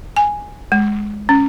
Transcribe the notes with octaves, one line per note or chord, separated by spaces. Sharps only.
G#5
G#3
C#4